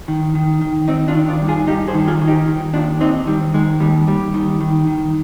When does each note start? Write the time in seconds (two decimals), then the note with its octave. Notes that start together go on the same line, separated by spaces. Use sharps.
0.08 D#3
0.35 D#3
0.61 D#3
0.88 D#3 C4 D#4
1.08 D4 F4
1.15 D#3
1.28 D4 F4
1.42 G2
1.48 F4 G#4
1.67 G2 D#4 G4
1.88 G#4 C5
1.94 D#3
2.08 F4 G#4
2.21 D#3
2.28 D#4 G4
2.47 D#3
2.74 D#2 D4 F4
3.00 D#3 C4 D#4
3.27 D#3 G3
3.54 D#3 G#3
3.80 D#2 G3
4.07 D#2 G3
4.34 D#3
4.60 D#3
4.87 D#3